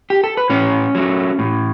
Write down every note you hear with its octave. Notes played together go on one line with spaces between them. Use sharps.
G4
A4
B4
A2 C#4 C#5
F#3 A3
A2